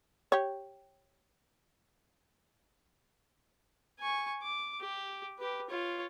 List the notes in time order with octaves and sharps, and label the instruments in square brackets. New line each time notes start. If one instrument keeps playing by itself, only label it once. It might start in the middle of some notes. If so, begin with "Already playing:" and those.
[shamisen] G4 C#5
[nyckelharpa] G#5 C#6
D6
G4
G4 B4
F4 C#5